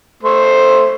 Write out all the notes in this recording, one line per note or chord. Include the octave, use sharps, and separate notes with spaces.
A3 C5